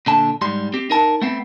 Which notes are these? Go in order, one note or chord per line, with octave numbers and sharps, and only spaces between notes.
A#2 D3 A5
G#2 G3 C6
C4 G4
D#4 A#4 A5
A3 B3 C4